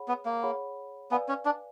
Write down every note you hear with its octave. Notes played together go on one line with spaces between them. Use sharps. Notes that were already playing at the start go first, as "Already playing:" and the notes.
Already playing: G#4 C#5 F#5 B5
B3
A#3
G#4 C#5 F#5 B5
B3 B4 D5 F5 G#5
C#4
D4